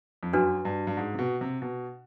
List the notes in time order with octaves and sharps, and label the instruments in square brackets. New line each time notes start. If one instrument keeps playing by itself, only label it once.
[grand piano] F2
[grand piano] F#2 [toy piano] D4 F#4 B4
[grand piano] G2
G2
G#2
C3
B2
C3
B2